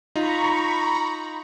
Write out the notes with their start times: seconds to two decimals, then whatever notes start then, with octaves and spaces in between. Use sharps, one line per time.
0.16 D#4 F4 A#5 B5 C#6